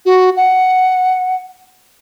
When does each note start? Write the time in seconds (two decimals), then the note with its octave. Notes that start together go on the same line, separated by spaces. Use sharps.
0.06 F#4
0.37 F#5